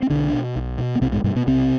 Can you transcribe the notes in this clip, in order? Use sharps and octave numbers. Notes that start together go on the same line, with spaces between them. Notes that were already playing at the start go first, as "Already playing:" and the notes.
C4
B1 D3 D4
B2
B1
B2
B3
B1 C3 C4
G#2 G#3
G2 B2 G3
B2 B3
B1 C3 C4